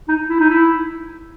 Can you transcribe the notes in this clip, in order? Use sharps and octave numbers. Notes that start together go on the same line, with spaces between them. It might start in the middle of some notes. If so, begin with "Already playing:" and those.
D#4
E4
D#4
E4